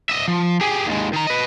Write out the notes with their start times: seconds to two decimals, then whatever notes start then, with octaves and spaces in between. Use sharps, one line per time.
0.09 D#5 E5
0.28 F3
0.61 G4 G#4
0.87 D#2 G#3
1.13 D#3 A#5
1.27 B4 D#5